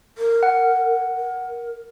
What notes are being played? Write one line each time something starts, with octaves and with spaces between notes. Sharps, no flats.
A#4
F#5
A#4